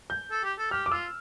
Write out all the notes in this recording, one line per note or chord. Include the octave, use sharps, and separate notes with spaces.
G6
A4
G4
A4
G4 F6
D6
F4 E6